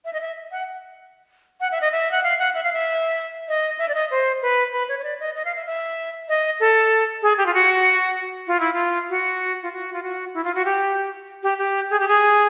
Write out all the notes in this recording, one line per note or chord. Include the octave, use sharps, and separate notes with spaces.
E5
D#5
E5
F#5
F#5
E5
D#5
E5
F#5
F5
F#5
E5
F5
E5
D#5
E5
D5
D#5
C5
B4
B4
C#5
C#5
D5
D#5
D#5
F5
E5
E5
D#5
A4
G#4
G4
F4
F#4
F4
E4
F4
F#4
F4
F#4
F4
F#4
E4
F4
F#4
G4
G4
G4
G#4
G4
G#4